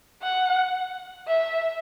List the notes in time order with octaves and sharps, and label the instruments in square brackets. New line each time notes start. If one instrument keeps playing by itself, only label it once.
[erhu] F#5
E5